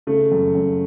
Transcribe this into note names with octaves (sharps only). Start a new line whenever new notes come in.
C#3 A3
F#2
F#2